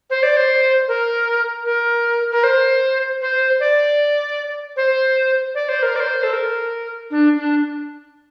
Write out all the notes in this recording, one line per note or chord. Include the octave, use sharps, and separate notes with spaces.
C5
D5
C5
A#4
A#4
A#4
C5
C5
D5
C5
D5
C5
A#4
D5
C5
A4
A#4
D4
D4